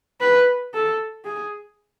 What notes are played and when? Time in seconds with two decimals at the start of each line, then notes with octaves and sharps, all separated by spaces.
0.21 B4
0.74 A4
1.25 G#4